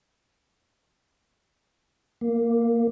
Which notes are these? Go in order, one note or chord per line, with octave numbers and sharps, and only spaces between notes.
A#3